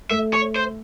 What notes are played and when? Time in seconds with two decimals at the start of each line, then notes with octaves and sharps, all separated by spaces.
0.10 A3 E5
0.33 C#5
0.56 C5